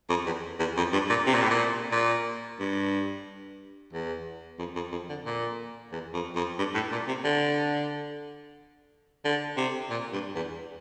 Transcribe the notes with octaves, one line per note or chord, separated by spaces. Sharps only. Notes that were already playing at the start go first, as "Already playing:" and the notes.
F2
E2
E2
F2
G2
A#2
C3
A#2
A2
A#2
A#2
G2
E2
F2
F2
F2
D3
A#2
E2
F2
F2
G2
A2
A#2
C3
D3
D3
C3
A#2
G2
E2